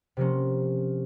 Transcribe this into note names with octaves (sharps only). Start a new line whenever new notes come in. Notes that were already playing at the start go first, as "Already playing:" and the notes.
C3 F3 A#3 C#4